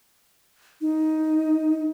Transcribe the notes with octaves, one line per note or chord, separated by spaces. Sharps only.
D#4